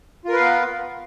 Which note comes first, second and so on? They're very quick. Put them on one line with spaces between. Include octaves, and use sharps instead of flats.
F4 A#4 B4 F5 B3